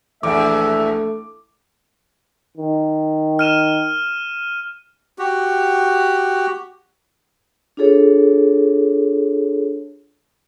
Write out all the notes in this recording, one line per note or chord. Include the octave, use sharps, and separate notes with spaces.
A#1 E2 A3 E5 D6
D#3
F6 D#7 E7
F#4 G4
D4 F4 G#4 A4 C#5